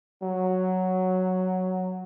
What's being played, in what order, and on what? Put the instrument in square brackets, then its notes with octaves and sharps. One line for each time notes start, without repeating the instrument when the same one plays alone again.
[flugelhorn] F#3